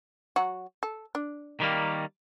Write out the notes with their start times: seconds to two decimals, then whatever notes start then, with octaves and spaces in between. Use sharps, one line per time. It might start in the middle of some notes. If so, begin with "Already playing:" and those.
0.36 F#3 F#4
0.83 A4
1.15 D4
1.60 D#3 G3 A#3